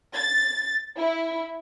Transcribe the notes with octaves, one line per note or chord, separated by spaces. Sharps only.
A6
E4